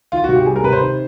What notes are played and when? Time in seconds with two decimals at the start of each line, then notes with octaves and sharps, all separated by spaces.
0.12 D#3 F4
0.24 C3 F#4
0.36 G4
0.46 G3 G#4
0.56 A#4
0.64 C3 B4
0.73 C5
0.81 D#3